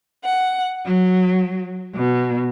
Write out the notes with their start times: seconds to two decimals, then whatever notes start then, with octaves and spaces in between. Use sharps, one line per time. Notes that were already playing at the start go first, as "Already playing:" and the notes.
0.24 F#5
0.87 F#3
1.96 B2